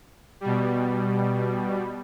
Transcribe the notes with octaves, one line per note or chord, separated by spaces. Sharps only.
B2 G3